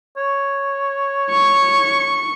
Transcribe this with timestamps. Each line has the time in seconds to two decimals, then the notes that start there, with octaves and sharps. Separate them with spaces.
0.17 C#5
1.31 C#6